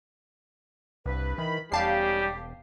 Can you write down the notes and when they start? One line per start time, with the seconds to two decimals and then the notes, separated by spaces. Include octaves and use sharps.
1.06 C2 G2 B4
1.38 D#3 E3 B5
1.72 E1 G3 C#4 D#4 G4 F5 A5 C7